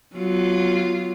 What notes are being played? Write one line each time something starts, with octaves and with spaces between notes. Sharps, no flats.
F#3 B3 F4